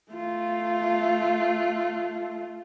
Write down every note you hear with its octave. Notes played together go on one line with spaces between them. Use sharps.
A3 F4